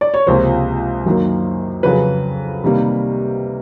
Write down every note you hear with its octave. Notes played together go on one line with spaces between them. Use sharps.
D5
C#5
C#2 C3 F3 A#3 C5
F#2 D#3 F#3 A#3
F2 C#3 F#3 B4
C3 D#3 G3 A#3